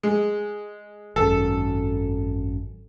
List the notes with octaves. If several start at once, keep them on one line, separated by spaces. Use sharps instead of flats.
G#3
G#1 F#2 A4